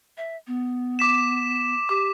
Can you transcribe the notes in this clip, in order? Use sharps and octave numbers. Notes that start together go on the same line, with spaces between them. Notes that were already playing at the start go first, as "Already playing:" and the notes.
E5
B3
D6 B6 E7
G4 D6